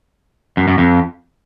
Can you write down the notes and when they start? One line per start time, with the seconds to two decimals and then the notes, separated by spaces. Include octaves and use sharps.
0.57 F#2
0.68 F#2
0.78 F2